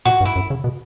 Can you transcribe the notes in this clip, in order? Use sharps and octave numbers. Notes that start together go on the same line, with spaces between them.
A#2 F#4
G2
E4
F#2
C#3
B2